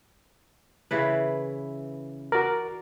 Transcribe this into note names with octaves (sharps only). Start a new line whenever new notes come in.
C#3 E3 B4
F#4 A#4 D5